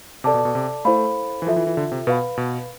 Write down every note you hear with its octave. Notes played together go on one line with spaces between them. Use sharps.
C3 A4 D5 A5 D6
B2
B2
C3
A3 E4 A4 C5 F5 B5
E3
F3 F4 A4 E5
E3
E3
D3
C3
B2 B4 F5 B5
B2